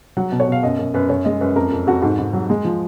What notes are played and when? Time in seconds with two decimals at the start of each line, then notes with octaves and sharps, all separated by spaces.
0.17 F#3 F#5
0.32 B2
0.40 C#5
0.48 B2 F5
0.63 F#2 D#5
0.79 F#2
0.94 F#2 B4
1.09 F#2 C#5
1.25 G#3 D#5
1.41 F#2 B4
1.56 F2 A#4
1.72 F2
1.87 F2 F#4
2.02 G#2 F#4
2.18 G#2
2.33 F#3
2.50 G#3
2.64 F3